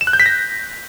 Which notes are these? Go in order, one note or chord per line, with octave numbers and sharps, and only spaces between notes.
E7
F#6
G6
B6
A#6